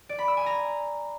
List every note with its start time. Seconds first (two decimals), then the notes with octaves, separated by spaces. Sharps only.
0.09 D5
0.19 B5
0.28 E6
0.37 G#5
0.46 A#5